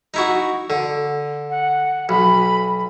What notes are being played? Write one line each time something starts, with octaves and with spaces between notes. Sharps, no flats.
D#4 E4 F#4
D3
F#5
B1 B5